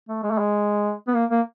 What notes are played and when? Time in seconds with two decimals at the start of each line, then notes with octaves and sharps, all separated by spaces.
0.08 A3
0.23 G#3
0.31 A3
0.38 G#3
1.07 B3
1.14 A#3
1.30 A#3